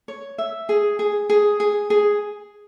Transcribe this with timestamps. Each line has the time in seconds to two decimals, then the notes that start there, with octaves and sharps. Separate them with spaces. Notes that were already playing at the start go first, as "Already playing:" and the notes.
0.08 C#5
0.38 E5
0.69 G#4
0.99 G#4
1.30 G#4
1.60 G#4
1.90 G#4